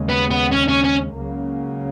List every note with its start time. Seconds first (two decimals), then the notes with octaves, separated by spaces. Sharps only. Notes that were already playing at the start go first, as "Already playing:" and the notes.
Already playing: D#2 C#3 G#3
0.09 B3
0.31 B3
0.51 C#4
0.68 C#4
0.84 C#4
1.15 C#2 C#3 F#3 A#3 C#4